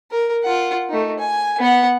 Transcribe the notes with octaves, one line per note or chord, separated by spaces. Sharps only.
A#4
F4 F#5
A3 D#4
G#5
B3 F#5